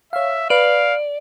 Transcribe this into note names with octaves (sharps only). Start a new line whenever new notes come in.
C#5 E5 F5
B4 D5 F5